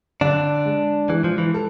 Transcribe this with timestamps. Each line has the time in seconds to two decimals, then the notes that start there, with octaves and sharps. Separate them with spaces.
0.21 D3 D4
0.65 G#3
1.10 E3 G#3
1.24 F3
1.38 E3
1.54 A4